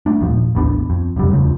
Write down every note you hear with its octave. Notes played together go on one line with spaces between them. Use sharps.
A3 D4
D#1 A#2 F3
A1 D#2 B3 D4
F2
E1 C#2 F#2 G3
E1 D2 C#3 F3